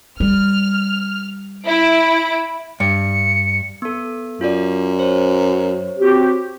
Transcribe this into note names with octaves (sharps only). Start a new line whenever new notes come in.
G3 F6
E4 D7
G2 C#7
B3 A4
F#2 F4 D5
C5 C#5
C4 F#4 G4